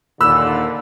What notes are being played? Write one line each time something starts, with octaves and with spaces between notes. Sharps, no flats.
D#2 A#2 D3 B5 E6 F#6